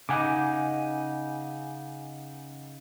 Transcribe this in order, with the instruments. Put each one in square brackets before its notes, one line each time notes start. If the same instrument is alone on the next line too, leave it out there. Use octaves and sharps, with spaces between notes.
[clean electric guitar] C#3 D#4 [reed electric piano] F#5 G#5 D6